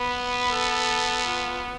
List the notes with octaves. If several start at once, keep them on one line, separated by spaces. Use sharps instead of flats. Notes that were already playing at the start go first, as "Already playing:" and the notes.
Already playing: B3 B4
A4
F4